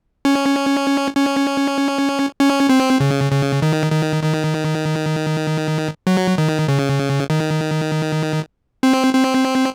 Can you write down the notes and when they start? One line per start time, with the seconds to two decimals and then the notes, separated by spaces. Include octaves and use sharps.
0.25 C#4
1.16 C#4
2.39 C#4
2.69 C4
3.00 C#3
3.32 C#3
3.62 D#3
3.92 D#3
4.23 D#3
6.07 F#3
6.38 D#3
6.68 C#3
7.30 D#3
8.83 C4
9.14 C4